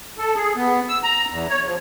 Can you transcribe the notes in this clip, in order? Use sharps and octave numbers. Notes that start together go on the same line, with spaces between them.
A4
G#4
B3
E6
A#5
E2
C#5
F3